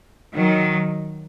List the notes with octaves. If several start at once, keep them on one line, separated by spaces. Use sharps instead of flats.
D#3 F#3